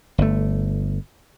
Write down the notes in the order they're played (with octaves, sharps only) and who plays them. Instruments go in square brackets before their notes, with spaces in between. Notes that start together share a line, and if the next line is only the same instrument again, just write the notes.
[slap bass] G1 A3